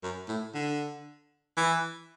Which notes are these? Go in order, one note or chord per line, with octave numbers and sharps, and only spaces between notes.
F#2
A2
D3
E3